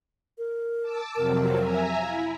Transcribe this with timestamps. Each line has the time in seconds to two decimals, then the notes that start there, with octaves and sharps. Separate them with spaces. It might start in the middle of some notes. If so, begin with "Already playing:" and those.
0.38 A#4
0.82 A5 D6 E6
1.16 F2 C3 F#3 A#4
1.56 E5 G#5 A#5
2.02 E4 F5